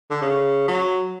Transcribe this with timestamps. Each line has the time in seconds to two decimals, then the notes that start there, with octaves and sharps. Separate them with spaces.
0.11 D3
0.22 C#3
0.68 F#3